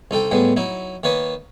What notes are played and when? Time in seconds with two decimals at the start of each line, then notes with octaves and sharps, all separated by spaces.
0.11 C2 D#4 A4 G5
0.31 A2 G3 G#3 B3
0.57 F#3 D#4 E4
1.03 D#3 A#3 B4 C#5 D#5